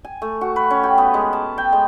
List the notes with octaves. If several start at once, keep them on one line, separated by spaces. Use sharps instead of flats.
G#5
A3
F#4
B4
C#4
G4
B3
G#3
A5
G5
G#3